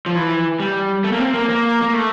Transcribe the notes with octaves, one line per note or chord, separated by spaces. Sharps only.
F3
E3
G3
A3
A#3
C4
A#3
A#3
A#3
A3